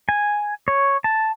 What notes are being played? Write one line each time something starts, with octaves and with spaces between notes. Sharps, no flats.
G#5
C#5
A5